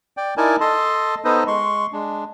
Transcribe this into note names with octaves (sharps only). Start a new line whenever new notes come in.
D5 G5
D#4 E4 A#4 D5 G#5 A5
A4 D#5 A5 C6
B3 D#4 A4 B4 C5 D#5
G#3 C6 C#6
G#3 D4